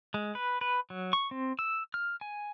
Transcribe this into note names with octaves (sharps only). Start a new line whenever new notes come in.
G#3
B4
B4
F#3
C#6
C4
E6
F6
G#5